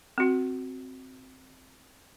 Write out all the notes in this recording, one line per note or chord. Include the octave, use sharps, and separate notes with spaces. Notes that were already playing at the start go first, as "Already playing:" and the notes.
C4 F#4